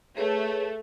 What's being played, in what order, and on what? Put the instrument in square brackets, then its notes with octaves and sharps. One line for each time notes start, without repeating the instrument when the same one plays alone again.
[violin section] A3 [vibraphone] G#4 B4 C#5